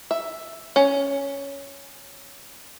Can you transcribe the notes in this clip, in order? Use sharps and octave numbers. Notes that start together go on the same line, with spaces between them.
E5
C#4